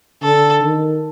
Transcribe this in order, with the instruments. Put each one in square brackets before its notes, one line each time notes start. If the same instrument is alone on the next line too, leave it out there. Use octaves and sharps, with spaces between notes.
[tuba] D3 [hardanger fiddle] A4
[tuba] D#3